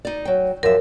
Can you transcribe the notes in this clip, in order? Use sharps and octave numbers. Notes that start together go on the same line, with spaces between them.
D#4 D5
F#3 G5
F#2 F3 A#4 E5